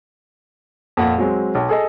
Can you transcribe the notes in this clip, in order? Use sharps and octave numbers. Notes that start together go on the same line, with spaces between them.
F2 A#2 F#5
F#3 G#3 C4
B1
G#4 A4 D#5